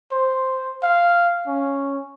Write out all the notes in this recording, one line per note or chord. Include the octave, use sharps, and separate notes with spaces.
C5
F5
C#4